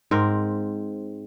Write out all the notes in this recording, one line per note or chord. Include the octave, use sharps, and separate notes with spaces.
G#2 C4 A#4